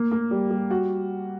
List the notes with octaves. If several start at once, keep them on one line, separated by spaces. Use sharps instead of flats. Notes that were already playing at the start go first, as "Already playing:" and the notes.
Already playing: A#3
A#3
G3
G3
F#4